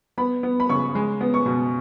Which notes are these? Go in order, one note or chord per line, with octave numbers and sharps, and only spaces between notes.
B3 B5
B3
B5
C#3 C#6
G#3
B3
C#6
B2